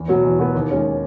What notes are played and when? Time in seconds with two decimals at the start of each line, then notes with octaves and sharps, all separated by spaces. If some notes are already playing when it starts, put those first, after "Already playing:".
Already playing: E2
0.08 B2 F#3 B3
0.23 E2
0.39 B2 F#3 B3
0.55 D#2
0.70 D#3 G#3 C#4